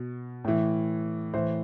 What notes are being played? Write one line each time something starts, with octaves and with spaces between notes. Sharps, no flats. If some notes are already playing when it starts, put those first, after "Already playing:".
Already playing: B2
A2 E3
A2 E3 C5